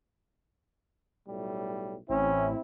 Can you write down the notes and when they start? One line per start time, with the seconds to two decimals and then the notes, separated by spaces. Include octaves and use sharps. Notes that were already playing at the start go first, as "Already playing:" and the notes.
1.28 B1 A2 G3
2.09 A1 C4 C#4 E4